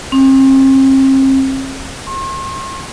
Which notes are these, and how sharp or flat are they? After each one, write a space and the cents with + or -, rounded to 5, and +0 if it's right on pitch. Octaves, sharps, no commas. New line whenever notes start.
C4 +40
C6 +45